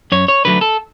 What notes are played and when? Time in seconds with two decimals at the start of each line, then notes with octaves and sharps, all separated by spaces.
0.12 F#2 C#5
0.28 C#5
0.45 D3 F#3 A3 B4
0.61 A4